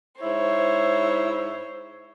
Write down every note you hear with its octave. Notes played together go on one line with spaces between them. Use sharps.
G#2 E4 C5 C#5